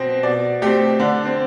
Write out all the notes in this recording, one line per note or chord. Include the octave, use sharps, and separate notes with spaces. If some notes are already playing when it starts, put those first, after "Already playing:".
Already playing: B2 C4
B2 D5
A3 C4 G4
D3 D4
C4